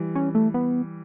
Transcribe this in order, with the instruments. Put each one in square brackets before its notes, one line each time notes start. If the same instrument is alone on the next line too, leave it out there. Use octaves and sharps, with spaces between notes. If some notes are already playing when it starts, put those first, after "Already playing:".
Already playing: [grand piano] E3 G3
[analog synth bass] C#4
A3
B3